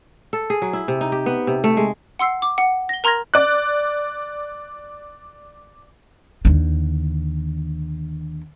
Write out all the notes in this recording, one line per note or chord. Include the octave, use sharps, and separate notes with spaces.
A4
G#4
F#3
E4
C3
D#4
G4
B3
C3
A3
G#3
F#5 C6 E6 C7
D6
F#5
A#6 G7
A#4 A#5 C6 F6 G#6 A#6
D5 F#6
D#2 D3